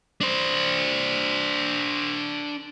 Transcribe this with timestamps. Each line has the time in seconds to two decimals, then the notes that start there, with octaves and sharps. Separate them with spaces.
0.21 D4 C5